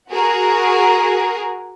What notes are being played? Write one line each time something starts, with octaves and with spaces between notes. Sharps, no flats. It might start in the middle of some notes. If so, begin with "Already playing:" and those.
F#4 G#4 A#4